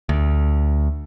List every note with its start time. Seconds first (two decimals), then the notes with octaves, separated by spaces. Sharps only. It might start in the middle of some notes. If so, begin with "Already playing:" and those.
0.09 D2